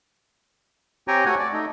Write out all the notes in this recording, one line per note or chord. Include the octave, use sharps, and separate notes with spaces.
C4 G4 C#5 G5 G#5 A#5
A3 F#4 C#5 F#5 G#5
D5
A3 D#4